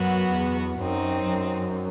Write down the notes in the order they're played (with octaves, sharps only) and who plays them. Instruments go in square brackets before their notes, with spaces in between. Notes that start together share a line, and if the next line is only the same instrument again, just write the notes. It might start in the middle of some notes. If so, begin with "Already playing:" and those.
Already playing: [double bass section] F#2 [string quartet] F#3 B3 F#4
[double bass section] E2
[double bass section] F#2 [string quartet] F#3 C4 D#4
[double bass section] F#2